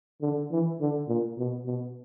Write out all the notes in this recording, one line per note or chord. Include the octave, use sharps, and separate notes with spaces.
D3
E3
D3
A#2
B2
B2